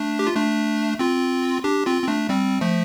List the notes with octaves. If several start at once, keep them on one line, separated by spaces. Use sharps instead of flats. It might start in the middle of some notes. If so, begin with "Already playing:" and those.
Already playing: A3 D4
G4
F4
A3 D4
C4 F4
D4 G4
C4 F4
C4
A3 D4
G3 C4
F3 A3